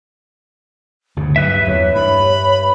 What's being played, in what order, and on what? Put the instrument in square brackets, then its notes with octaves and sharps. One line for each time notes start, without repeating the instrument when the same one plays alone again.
[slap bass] D2 G2 C#3
[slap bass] G2 [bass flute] F#3 [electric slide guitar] B4 E5
[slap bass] E2 [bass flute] C#5
[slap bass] G2 [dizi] B5